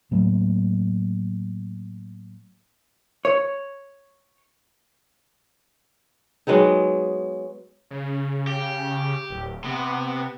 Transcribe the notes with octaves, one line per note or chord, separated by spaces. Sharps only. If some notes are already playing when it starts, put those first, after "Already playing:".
A2 F#3 A3 A#3
C#5
F#3 G#3 B3 D#4
C#3
G4
D1
C3 B3